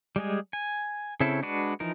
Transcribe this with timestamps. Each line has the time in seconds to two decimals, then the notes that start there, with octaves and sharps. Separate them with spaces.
0.16 G3 G#3 G#4
0.53 G#5
1.20 C#3 C4 C#4 E4 A4
1.42 G#3 D4 F#4 B4
1.80 E3 F3 D#4 A#4